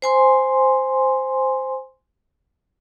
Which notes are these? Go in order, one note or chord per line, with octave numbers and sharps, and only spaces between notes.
C5 G#5 C6